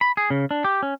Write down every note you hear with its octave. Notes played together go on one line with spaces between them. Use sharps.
B5
G#4
C#3
D4
G4
C#4